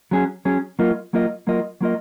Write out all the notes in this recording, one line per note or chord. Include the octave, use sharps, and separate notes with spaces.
F#3 C#4 G#4
F#3 C#4 G#4
F#3 A#3 F4 A#4 D#5
F#3 A#3 F4 A#4 D#5
F#3 A#3 F4 A#4 D#5
F#3 A#3 F4 A#4 D#5